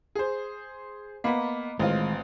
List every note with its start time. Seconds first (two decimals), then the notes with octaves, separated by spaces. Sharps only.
0.15 G#4 C5
1.24 A#3 B3 D#5 B5 D6
1.79 A1 D#3 G#3 C4 F4